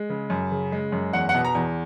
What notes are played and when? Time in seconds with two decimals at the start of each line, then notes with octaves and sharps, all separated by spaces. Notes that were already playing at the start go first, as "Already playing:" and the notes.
Already playing: G#3
0.10 C#3
0.30 F#2
0.51 C#3
0.72 G#3
0.92 F#2
1.13 E2 F#5
1.29 F#5
1.34 B2
1.45 A#5
1.55 E2